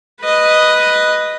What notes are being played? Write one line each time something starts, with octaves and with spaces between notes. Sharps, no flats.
B4 D#5